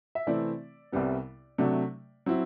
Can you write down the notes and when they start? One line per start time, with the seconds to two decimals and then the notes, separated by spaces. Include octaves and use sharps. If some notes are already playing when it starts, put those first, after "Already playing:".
0.15 E5
0.27 C3 E3 A3 C4 E4 D5
0.92 C2 C3 G3 B3
1.58 C3 F#3 A3 D4
2.26 F#3 C4 E4